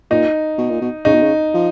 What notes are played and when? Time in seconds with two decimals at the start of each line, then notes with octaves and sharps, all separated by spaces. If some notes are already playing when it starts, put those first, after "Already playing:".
0.10 A#2 D#4
0.58 B2
0.70 A#2
0.81 B2
1.05 C#3 D#4
1.14 B2
1.22 C#3
1.54 F3